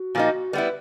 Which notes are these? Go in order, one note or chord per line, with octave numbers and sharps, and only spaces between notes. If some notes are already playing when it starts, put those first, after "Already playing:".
Already playing: F#4
A#2 F3 A#3 D#4
G3 B3 E4 B4